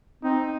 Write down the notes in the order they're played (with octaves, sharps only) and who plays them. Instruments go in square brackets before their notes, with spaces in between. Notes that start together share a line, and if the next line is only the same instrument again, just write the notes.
[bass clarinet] C4 [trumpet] D#4